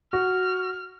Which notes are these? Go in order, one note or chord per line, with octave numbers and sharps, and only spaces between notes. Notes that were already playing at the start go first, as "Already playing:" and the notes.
F#4 F6